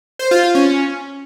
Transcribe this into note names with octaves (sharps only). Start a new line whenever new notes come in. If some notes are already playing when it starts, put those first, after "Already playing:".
C5
F4
F4
C#4